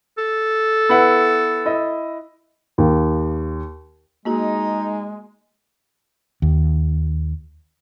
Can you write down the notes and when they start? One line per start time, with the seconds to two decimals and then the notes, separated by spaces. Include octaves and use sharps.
0.18 A4
0.89 B3 E4 F#5
1.66 E4 D#5
2.78 D#2
4.25 G#3 A#3 D#4 F#4 G#4
6.42 D#2